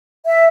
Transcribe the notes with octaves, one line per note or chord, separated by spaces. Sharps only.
E5